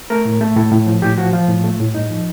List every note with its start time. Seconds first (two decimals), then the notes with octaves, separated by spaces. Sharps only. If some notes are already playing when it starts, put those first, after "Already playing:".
0.10 A3 A#4
0.25 A2
0.41 A3
0.56 A2 A4
0.72 A2
0.87 F3
1.02 A2 G4
1.18 F3 F#4
1.33 F3 F4
1.49 A2
1.64 A3
1.80 A2
1.95 G2 D#4
2.10 F3